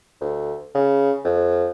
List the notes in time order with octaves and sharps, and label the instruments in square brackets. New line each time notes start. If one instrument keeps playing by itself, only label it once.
[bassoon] D2
C#3
F2